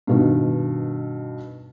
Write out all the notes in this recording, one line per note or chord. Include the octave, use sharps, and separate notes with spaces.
G2 B2 D#3